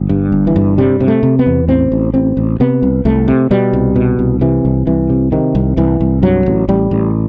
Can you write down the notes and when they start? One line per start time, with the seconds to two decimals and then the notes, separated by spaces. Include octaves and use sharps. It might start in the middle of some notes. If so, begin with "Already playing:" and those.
Already playing: G1
0.09 G2
0.32 G1
0.47 E3
0.56 G2
0.78 C3 G3
1.00 C3
1.08 A3
1.23 C3
1.39 B3
1.46 E2
1.68 A1 C4
1.92 A1
2.14 A1 C4
2.37 A1
2.60 C3 B3
2.83 C2
3.05 C2 A3
3.28 C3
3.51 B2 G3
3.73 C2
3.96 B2
4.19 C2
4.41 C3 E3
4.65 C2
4.87 C2 E3
5.10 C3
5.32 C3 D#3
5.55 C2
5.77 C2 E3
6.01 C2
6.23 G2 F#3
6.46 A1
6.68 A1 G3
6.91 A1